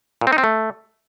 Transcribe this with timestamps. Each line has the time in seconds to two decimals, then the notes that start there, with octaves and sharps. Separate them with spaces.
0.21 A#2
0.27 C4
0.33 D#4
0.38 C4
0.44 A3